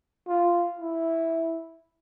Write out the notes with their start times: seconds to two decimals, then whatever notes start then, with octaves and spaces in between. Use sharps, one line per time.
0.27 F4
0.79 E4